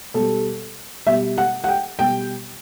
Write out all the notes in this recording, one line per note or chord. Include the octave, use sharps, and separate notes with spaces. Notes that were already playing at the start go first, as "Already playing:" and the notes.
B2 G3 A4
B2 G3 E5
F#5
F#5
G5
B2 G3 G5